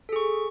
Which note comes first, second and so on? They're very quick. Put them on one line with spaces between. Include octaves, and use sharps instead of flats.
A4 G#4 C#6